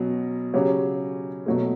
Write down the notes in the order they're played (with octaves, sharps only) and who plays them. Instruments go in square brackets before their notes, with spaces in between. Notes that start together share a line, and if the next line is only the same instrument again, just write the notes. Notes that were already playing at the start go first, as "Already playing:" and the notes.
Already playing: [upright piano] B2 F#3 C#4
C#3 F#3 C#4 G4
B2 F#3 A3